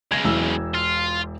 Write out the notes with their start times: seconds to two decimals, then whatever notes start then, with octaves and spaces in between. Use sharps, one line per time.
0.12 B1 C#3 G#6 A#6
0.24 E1 E3 E6
0.74 F4